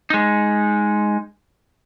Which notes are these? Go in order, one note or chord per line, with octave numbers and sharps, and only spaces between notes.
G#3 D#4